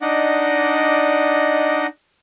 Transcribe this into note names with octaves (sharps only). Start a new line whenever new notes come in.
D4 D#4 D5 D#5 F#5